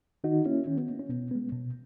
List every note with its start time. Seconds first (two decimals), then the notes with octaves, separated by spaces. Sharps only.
0.24 D#3 D#4 F#4
0.45 A#3 C#4 E4
0.67 D#3 C#4
0.78 B3
0.88 A#3
1.00 C#4
1.09 B2 B3
1.31 G#3 B3
1.52 B2